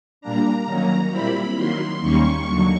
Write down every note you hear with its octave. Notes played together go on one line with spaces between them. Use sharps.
A#2 G3 A#3 D4 A#5
D#3 F#3 A#3 C#4
A#2 G3 C4 E4 B5
D#3 F#3 A#3 C6
D#2 D#3 G3 A#3 C#4 C#6
D#2 D3 F#3